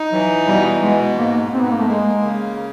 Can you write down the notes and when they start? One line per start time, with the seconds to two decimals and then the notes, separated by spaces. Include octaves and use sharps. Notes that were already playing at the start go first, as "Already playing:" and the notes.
Already playing: D#4
0.12 E3 F#3
0.47 B2 G3
0.82 B2 G#3
1.18 G#2 A#3
1.52 G#2 C4
1.61 B3
1.70 A#3
1.79 A3
1.87 G#3 A#3
2.22 C#3